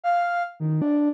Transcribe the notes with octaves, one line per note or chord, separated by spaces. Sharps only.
F5
D#3
D4